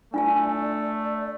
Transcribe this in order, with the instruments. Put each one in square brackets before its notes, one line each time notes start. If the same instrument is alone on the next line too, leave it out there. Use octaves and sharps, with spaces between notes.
[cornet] A3 [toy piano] D4 F4 G#5 [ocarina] D5